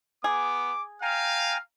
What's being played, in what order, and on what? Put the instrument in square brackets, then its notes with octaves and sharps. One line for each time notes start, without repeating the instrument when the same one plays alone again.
[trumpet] B3 [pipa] G#4 [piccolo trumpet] D6
[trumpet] F5 [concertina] G5 G#5 A#5 [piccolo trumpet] F6